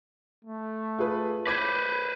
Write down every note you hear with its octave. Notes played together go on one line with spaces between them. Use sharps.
A3
F4 G#4 B4
B4 C5 B5 D6 G#6 B6